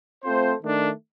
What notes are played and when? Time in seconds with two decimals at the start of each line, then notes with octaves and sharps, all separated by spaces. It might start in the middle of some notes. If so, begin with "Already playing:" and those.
0.23 A3 C4 F4 A4 C5
0.60 D#3 A3 D4